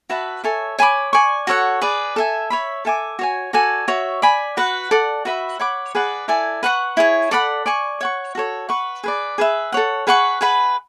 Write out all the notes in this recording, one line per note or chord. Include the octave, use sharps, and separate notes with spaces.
F#4 B4 E5 A5
A4 C#5 E5 G#5
C#5 G#5 B5 D6
D5 G#5 C#6
F#4 A4 C#5 F#5
G#4 B4 D5
A4 E5 G#5
C#5 E5 B5
A4 E5 G#5 D6
F#4 C#5 G#5
F#4 A4 D5 G#5
F#4 C#5 E5
D5 G#5 B5
F#4 B4 F#5
A4 D5 F#5
F#4 B4 E5 B5
C#5 F#5 B5 D6
G#4 B4 D5 F#5
E4 A4 D5 G#5
B4 F#5 A5 C#6
E4 G#4 C#5
A4 D5 F#5 B5
D5 G#5 C#6
C#5 F#5 C#6
F#4 A4 C#5
B4 F#5 C#6
G#4 B4 D5
G#4 B4 E5
A4 C#5 F#5
G#4 B4 F#5 C#6
G#4 B4 F#5 B5